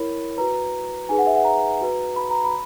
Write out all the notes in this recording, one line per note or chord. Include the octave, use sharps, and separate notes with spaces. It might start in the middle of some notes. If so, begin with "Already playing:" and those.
Already playing: E4 A#4 C#5 B5
F#4 B4 A#5
D#4 G#4 B4 G#5
F#5
E5
F#5
A#5
F#4 B4
B5
A#5
B5